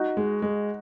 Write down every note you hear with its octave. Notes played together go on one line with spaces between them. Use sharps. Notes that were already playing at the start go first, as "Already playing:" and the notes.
Already playing: D#4 F#4
G#3
G#3